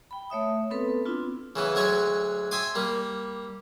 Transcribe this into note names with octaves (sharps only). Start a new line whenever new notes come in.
G5 B5
A3 C#5 E5 D#6
B3 C4 A4 B4
B3 C4 D4 E4 F4
C#3 E3 B3
D2 F#3 G#3 C#5 C#6
E5 G5 G#5 C6 D6 D#6
G3 A#3